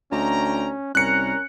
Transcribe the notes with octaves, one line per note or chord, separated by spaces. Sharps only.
D2 C#4 D#4 G5 A#5
C2 C#4 A#4 A#5 F#6 C#7